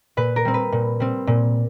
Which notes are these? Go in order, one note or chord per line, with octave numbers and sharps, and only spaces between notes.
A#2 B4
A#4
G3 C4
B4
A#2
G3 C4
A#2